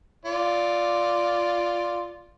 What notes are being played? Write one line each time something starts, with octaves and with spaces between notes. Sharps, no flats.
F4 D5